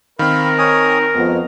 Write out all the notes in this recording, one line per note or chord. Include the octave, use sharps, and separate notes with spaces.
D#3 C4 A#4 F5 B5
C#5 G#5 D#6
F2 F3 G#3 B3